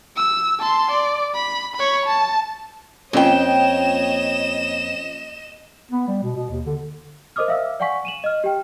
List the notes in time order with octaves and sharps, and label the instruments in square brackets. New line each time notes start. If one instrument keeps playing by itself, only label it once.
[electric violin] E6
A5 C6
D5
B5
C#5 B5
A5
[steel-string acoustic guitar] F2 G5 [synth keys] A#3 C#4 F4 [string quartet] C#5 [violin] D#5 E7
[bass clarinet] B3
G3
B2
B2
D#2
D3
[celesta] A#4 C5 D#5 D6 D#6 F6
E5 F5 E6
D5 F5 F#5 G#5 C#6 B6
D#7 E7 F#7
D#5 F6
G4 G5